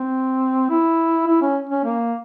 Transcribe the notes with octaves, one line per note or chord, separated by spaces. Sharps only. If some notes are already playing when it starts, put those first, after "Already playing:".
Already playing: C4
E4
E4
C#4
C#4
A#3